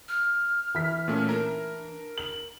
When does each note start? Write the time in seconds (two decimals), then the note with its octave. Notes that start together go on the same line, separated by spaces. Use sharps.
0.08 F6
0.75 E3 B6
1.08 A#2 A3 C#4
1.29 D4 A#4
2.18 F#7